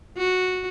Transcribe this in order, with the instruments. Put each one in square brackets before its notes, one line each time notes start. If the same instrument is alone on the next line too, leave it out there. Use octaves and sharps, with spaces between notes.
[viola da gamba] F#4